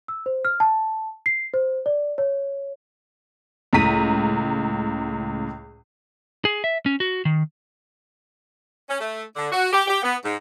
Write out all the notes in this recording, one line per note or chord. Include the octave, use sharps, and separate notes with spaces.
E6
C5
F6
A5
C7
C5
D5
C#5
C#2 A2 A#5 B6 D#7
G#4
E5
C#4
F#4
D#3
C#4
A3
D3
F#4
G4
G4
B3
G#2